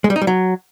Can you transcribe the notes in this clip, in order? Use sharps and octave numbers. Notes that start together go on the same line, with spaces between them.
G#3
G3
D#4
G3
F#3